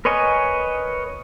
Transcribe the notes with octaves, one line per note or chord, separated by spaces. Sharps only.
A#4 B4 C#5 D#5 G#5